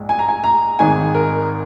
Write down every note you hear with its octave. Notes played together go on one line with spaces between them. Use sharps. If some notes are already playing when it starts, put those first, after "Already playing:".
Already playing: A#1 G#2 G#3
G#5
A#5
G#5
A#5
G#1 G#2 D#3 G#3 G#5
A#4